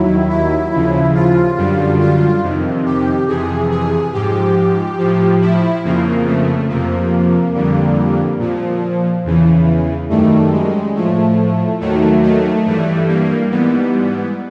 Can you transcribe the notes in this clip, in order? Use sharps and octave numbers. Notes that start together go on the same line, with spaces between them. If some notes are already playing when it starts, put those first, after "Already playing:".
Already playing: D#2 D#3 F#3 E4
E4
D#2 C#3 F3
F4
F#2 D3 G3
F4
F2 C3 D#3
G4
F2 C3 E3 G#4
G#4
G#2 F3 G4
A2 F3
E4
F2 C#3 F3 A#3
A3
F2 C3 F3 A#3
F2 D3 G3
A#2 F3
E2 C#3 E3
F#2 D#3 G3 A3
G#3
A2 F3 A3
D#2 D#3 F#3 A3
A3
G2 E3 G3
A#3
G#2 E3 G3 B3